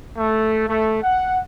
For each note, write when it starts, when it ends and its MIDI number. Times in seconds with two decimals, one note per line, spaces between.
0.18 0.66 57
0.68 1.03 57
1.03 1.40 78